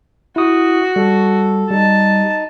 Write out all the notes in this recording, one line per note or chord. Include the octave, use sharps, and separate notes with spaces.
E4 F#4 D#6
G3 A4
G3 D#4 A5